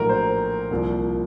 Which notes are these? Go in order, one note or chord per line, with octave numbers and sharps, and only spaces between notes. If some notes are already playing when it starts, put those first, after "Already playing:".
Already playing: A#1 A2 F#3 A#4
C5
C2 A#2 F3